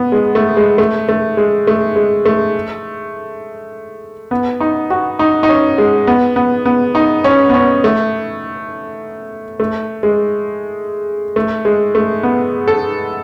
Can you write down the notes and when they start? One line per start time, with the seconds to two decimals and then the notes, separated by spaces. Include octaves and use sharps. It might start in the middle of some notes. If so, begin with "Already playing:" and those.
Already playing: B3
0.12 G#3
0.35 A3
0.57 G#3
0.78 A3
1.09 A3
1.37 G#3
1.67 A3
1.96 G#3
2.25 A3
4.31 B3
4.61 D#4
4.90 F#4
5.19 D#4
5.43 D#4
5.49 C#4
5.78 G#3
6.07 B3
6.36 B3
6.66 B3
6.95 D#4
7.24 C#4
7.50 B3
7.54 C#4
7.84 A3
9.60 A3
10.03 G#3
11.36 A3
11.65 G#3
11.95 A3
12.23 B3
12.68 A4